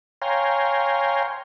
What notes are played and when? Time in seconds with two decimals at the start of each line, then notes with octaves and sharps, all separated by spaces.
0.22 C#5 F5 G5 G#5 A#5 C6